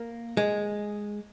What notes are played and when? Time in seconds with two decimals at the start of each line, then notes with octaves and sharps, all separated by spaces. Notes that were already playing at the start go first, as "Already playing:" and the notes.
Already playing: A#3
0.37 G#3